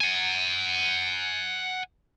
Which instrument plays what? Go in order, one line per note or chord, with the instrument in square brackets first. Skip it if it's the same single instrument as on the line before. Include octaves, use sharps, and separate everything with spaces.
[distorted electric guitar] F#5 G#5